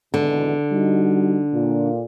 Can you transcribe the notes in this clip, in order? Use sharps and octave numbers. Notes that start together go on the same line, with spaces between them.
G#1 E2 B2 D3
G3 D#4 F#4
A#2